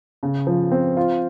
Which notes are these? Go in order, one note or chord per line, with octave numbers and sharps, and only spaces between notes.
C#3
F3
C4
F4